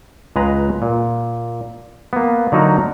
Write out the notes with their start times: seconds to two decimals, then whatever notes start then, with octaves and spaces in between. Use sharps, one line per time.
0.36 C#2 G#3 B4 A#5
0.82 A#2
2.13 A#3 B3
2.52 D3 F#3 D#4 F#4 A#4